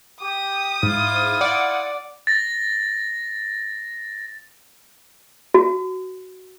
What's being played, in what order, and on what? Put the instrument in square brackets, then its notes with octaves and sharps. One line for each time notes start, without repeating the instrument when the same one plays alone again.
[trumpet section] G4 [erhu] D#6
[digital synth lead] G#2 [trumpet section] E4 F4
[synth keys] D5 [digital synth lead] F#5
[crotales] A6 A#6
[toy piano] F#4